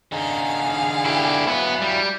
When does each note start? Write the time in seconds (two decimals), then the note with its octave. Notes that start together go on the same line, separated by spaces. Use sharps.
0.12 D3 D#4 G#4 F5
1.05 E4 G4
1.47 F#3 B3 E4 B4
1.81 G3